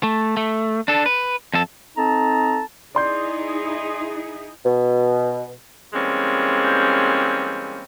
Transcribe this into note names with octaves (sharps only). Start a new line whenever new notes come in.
A3
A3
D4 A4
B4
F2 A4
C4 D#4 A4 A5 A#5
D#4 E4 G#4 D5 C6 G6
B2
E3 G3 G#3 A#3 C4 C#4